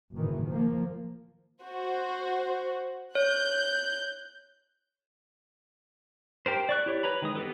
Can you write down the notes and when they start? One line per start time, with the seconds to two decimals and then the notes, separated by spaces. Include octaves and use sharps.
0.15 F#1 A2 D#3 E3
0.47 F3 A#3
1.62 F#4 C5
3.15 C#5 F#6 G6
6.46 G4 A#4 C5
6.69 D5 C#6 F#6
6.86 E4 G4 C#5
7.03 B4 C#5 A#5 B5
7.22 D#3 G#3 D#6
7.35 B3 D#4 G4 A4 B4